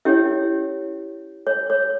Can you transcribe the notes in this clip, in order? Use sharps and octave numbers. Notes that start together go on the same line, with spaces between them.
C#4 E4 G4 C#5 E5
C#5
C#5